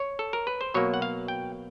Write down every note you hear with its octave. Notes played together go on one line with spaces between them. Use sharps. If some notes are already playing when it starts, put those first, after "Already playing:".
Already playing: C#5
A4
A#4
B4
C5
B2 F#3 A#3 C#5
F#5
F5
G5